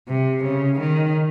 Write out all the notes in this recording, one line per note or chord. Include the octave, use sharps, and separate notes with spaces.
C3
C#3
D#3